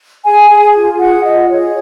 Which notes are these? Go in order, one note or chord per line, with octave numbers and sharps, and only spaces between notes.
G#4 G#5
G#4
F4
G#4 F#5
F4 D#5
G#4 C#5